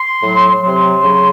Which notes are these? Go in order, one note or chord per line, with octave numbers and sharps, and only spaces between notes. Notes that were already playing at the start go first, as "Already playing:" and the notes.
Already playing: C6
A2 F#3
C3 F#3 C6
C#3 F#3